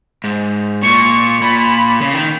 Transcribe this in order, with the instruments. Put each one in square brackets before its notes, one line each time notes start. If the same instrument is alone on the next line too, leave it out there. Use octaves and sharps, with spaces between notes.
[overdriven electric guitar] G#2
[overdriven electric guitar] A#2 [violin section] C#6
[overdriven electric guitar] A#2 [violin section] B5
[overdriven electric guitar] C#3
D#3